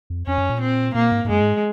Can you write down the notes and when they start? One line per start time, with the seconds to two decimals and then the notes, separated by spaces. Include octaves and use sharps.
0.10 F2
0.26 F2 C#4
0.38 F#2
0.49 A#2
0.61 C4
0.95 A#2 A#3
1.12 G#2
1.25 G#2
1.29 F#2 G#3
1.41 G#2